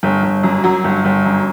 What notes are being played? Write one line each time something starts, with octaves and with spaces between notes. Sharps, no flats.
G1
G1
F#2
F#3
G1
G1
F#2